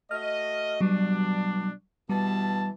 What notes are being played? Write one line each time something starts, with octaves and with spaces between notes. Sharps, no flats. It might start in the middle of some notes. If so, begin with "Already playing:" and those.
A3 F#4 D#5 F6
B2 F#3 G3 D4
B2 E3 G3 A5